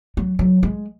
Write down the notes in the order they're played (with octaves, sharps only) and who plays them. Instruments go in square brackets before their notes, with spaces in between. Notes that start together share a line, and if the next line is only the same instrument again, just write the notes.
[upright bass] F#3
F#3
G#3